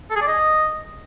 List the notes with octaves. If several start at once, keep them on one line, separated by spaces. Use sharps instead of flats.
A4
G#4
D5
D#5